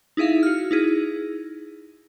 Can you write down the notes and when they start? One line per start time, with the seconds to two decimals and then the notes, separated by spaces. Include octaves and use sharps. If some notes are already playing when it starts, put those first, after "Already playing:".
0.17 D#4 E4 G#4 E5 F5
0.43 F#4 F6
0.71 D#4 E4 G#4